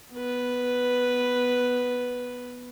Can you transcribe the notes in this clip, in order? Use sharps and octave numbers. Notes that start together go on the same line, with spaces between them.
B3 B4